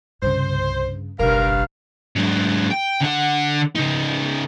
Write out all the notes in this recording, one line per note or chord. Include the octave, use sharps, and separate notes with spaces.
C2 G2 C#3 C5
F#1 B1 G2 A#4 F5 A#5
G#2 F#3
G5
D3 F#5
C#3 D#4